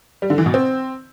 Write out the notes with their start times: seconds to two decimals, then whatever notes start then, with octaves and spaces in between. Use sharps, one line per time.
0.22 G3
0.30 D3
0.38 E3
0.46 B2
0.54 C4